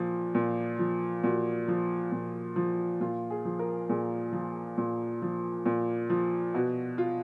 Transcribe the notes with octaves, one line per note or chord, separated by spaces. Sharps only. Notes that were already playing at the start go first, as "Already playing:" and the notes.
Already playing: A#2 F3
A#2
F3
A#2 F#4
F3
A#2
F3
A#2 F4
G#4
F3
A#4
A#2 G#4
F3
A#2
F3
A#2
F3
B2 F#4
F4